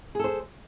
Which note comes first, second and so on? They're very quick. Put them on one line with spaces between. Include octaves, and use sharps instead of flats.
G#4 A4 C5